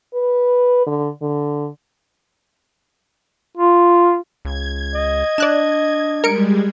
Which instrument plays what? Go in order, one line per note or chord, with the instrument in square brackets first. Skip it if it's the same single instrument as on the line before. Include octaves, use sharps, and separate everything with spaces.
[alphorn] B4
D3
D3
[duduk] F4
[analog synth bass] C#2 [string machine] G#6
[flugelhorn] D#5
[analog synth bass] D4 [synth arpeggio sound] D5 F#6 E7
[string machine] G3 G#3 [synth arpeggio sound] A#4 C#7 D7